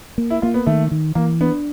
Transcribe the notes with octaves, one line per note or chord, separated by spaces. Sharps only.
A#3
E4
A#3 F4
B3
D#3 A3
D#3
E3 A#3
B3 D4